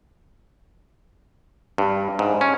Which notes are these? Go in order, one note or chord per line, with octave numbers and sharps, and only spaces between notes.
G2
G#2
C#4